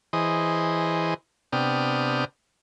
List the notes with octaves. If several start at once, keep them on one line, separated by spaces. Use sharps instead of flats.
E3 G#4 C5 D#5
C3 B3 D4 G5 D#6 F6